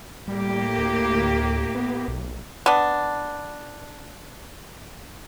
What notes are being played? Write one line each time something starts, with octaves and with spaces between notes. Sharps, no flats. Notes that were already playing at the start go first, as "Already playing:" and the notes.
A2 G3 A#3 G4
D2
B3
B1
B3 D4